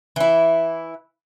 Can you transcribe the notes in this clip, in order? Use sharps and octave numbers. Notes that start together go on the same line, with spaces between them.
E3 E4